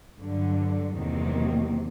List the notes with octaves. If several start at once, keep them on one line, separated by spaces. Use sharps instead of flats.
G2 D3 F#3
E2 C3 D#3 F#3 A#3